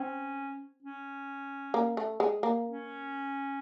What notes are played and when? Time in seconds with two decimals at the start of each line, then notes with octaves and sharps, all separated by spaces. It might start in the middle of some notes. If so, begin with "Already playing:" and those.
Already playing: C4 C#4
0.82 C#4
1.74 A#3
1.97 A3
2.20 G#3
2.43 A#3
2.65 C#4